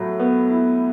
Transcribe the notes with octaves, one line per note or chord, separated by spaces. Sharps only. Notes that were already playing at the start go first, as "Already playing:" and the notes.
Already playing: A2 F#3
B3
E4